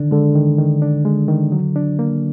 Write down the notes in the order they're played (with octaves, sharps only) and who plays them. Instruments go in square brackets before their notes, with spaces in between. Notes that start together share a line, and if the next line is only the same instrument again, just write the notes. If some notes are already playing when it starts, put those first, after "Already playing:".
Already playing: [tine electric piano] D3 [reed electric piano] D#3 D4
[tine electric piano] D3 [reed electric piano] G#3
[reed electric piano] D#3
D#3
D4
G#3
D#3
F#3
D4
A#3